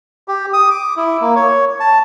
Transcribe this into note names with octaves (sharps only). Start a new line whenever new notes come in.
G4
D#6
D6
E4
A#3
C#5
A5